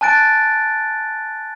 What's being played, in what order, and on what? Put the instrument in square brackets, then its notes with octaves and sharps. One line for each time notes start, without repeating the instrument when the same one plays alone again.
[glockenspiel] G#5 A5 F#6 A6 D7